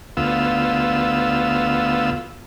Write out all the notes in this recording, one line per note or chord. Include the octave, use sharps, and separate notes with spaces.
D2 B3 F4 E6